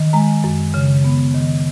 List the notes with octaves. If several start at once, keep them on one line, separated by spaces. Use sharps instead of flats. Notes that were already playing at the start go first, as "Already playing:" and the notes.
Already playing: D#3
G#3 A#5
F#2
C#3
B3
D#3